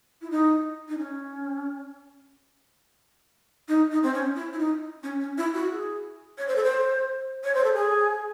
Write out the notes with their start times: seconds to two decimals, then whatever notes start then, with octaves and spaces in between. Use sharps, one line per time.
0.22 E4
0.31 D#4
0.89 D#4
0.98 C#4
3.68 D#4
3.92 D#4
4.03 C4
4.14 C#4
4.36 E4
4.53 E4
4.59 D#4
5.03 C#4
5.21 C#4
5.38 E4
5.54 F#4
5.71 G#4
6.38 C#5
6.48 C5
6.56 A4
6.64 C5
7.44 C#5
7.54 C5
7.64 A4
7.73 G#4